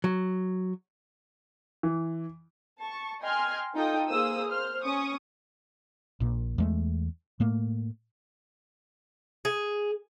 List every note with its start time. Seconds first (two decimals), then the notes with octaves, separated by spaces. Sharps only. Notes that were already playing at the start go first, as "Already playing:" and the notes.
0.04 F#3
1.83 E3
2.79 A5 C#6
3.22 D#5 G5 G#5 C6 F6 G#6
3.74 D#4 F4 A4 G5 D#6
4.08 A#3 G#4 C5 D#6 E6
4.47 C5 F6
4.84 C#4 C#6 D#6
6.20 A#1 A#2
6.58 E2 G#3 A3
7.40 A2 A3 A#3
9.45 G#4